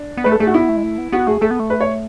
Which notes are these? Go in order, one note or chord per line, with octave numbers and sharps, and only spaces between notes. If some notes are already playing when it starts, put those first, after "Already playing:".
Already playing: D4
B3
A3 B4
A4
A3 G#4
F#4
B3 E4
A3
G#3
A3
B3
B3 F#4
A3 G#4
A3 A4
B3
A3
B4
C#5